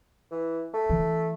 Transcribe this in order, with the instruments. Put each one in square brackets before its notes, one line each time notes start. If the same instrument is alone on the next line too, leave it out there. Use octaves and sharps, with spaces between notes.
[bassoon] E3
A3
[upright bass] E3